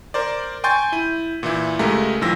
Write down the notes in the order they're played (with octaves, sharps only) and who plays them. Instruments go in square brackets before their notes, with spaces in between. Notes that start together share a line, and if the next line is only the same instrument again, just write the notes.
[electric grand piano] A#4 C5 D5
G5 G#5 C6 C#6 G6 A6
E4 D#7
A#2 E3 E4
C#2 G#3 A3 G4 A#4 E5
A#1 D#2 E3 F3 E6 A#6